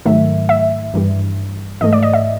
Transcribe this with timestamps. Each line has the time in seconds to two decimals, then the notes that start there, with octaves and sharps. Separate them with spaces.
0.05 G#2 D#3 F#3 A3 E5
0.49 E5
0.94 G2 E3 G3
1.81 G#2 E3 A3 D#5
1.93 D5
2.03 D#5
2.14 E5